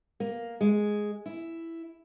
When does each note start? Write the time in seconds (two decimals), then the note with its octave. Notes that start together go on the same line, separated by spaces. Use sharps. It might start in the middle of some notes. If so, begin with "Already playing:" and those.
0.20 A#3
0.61 G#3
1.26 E4